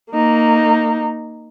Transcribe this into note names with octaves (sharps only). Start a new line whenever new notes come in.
A#3 D#4